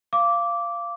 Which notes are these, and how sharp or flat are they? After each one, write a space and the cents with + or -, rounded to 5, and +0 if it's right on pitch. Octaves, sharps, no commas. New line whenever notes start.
F5 -20 D6 -10